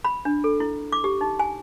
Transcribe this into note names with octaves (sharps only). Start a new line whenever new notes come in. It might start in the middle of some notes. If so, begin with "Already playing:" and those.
B5
D4
A4
E4
D6
G4
D#4
G#5